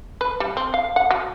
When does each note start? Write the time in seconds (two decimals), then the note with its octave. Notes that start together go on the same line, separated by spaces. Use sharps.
0.21 B4
0.40 G3
0.57 C4
0.74 F5
0.96 F#5
1.11 F#3